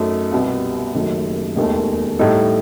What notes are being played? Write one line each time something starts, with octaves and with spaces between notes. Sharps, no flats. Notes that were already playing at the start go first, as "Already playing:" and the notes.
Already playing: F#2 F#3 A3 D#4
C2 B2 G3 B3
F#1 F#2 D#3 F#3 A3
E1 D#2 D#3 A3
A2 G3 D#4 A4